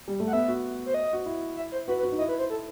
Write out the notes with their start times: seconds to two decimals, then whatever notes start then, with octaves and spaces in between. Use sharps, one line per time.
0.08 G3
0.20 A3
0.27 F#5
0.33 B3 E5
0.48 F#4
0.86 C5
0.94 D#5
1.13 F#4
1.26 E4
1.56 E5
1.72 C5
1.88 F#4 B4
1.99 B4
2.03 F#4
2.12 D#4
2.18 E4 D#5
2.29 B4
2.39 C5
2.50 A4